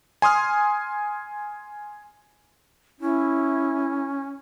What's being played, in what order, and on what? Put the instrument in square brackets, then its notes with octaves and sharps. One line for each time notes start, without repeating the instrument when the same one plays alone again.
[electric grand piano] G#5 C6 D#6 F6
[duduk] C#4 [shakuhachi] E4